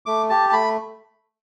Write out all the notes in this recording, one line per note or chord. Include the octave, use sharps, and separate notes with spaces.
A3 D6
G4 A5
A5
A3 B5